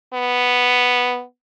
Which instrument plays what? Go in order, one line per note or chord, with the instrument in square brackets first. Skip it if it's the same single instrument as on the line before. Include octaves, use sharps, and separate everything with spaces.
[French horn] B3